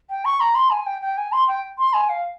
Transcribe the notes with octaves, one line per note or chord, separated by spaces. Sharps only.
G5
C#6
A#5
C6
G#5
G5
G5
G#5
C6
G5
C6
G#5
F5